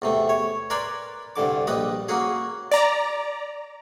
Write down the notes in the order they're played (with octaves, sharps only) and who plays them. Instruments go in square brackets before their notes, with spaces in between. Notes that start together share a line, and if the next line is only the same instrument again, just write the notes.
[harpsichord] E2 C3 A3
C#5
A#4 B4 D5 G#5 B5 C6
C2 G2 D3 D6
A#1 G3 B4 D#5 D#6
A#3 C#4 F#4 G#4
[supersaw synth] D5 A#5